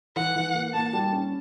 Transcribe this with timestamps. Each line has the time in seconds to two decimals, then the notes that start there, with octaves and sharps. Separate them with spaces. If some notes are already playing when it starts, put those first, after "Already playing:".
0.16 E3 F#5
0.36 E3
0.55 A#3
0.74 A#3 A5
0.93 G3
1.13 C#4